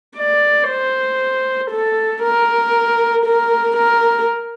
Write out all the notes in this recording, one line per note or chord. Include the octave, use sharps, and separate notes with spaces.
D5
C5
A4
A#4
A#4
A#4